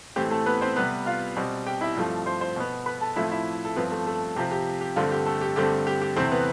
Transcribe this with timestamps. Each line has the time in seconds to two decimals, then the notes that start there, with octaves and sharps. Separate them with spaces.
0.16 A2 E3 A3 C4 G4
0.31 A3 A4
0.46 B3 B4
0.61 C4 C5
0.76 C3 G3 B3 B4
1.06 F4 F5
1.36 B2 G3 C4
1.67 G4 G5
1.81 E4 E5
1.96 G2 F3 A3 C4
2.26 C5 C6
2.41 C5 C6
2.56 B2 B3
2.86 B4 B5
3.01 A4 A5
3.16 A2 F3 A3 C4 E4 E5
3.31 E4 E5
3.65 A4
3.76 G2 F3 B3 C4 B4
3.91 A3 A4
4.06 A3 A4
4.36 C3 F3 C4 G4
4.51 G4
4.81 G4
4.96 G2 D3 A3 C4 F4
5.12 G4
5.26 A3 A4
5.41 G4
5.56 G2 D3 A3 C4 G4
5.87 G4
6.02 G4
6.16 E2 C3 E3 A3 C4 C5
6.31 B3 B4